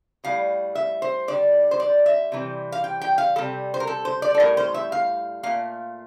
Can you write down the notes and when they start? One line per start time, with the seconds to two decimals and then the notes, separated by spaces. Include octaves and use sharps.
0.24 A2 G3 F5
0.75 E5
1.02 C5
1.28 D3 G3 D5
1.71 C5
1.80 D5
2.06 E5
2.32 C3 E3 G3
2.72 F5
2.84 G5
3.01 G5
3.18 F5
3.36 C3 G3 A4
3.74 C5
3.80 A#4
3.87 A4
4.05 C5
4.22 D5
4.34 A4
4.40 A2 G3 A#4
4.57 C5
4.74 E5
4.92 F5
5.43 A#2 A3 F5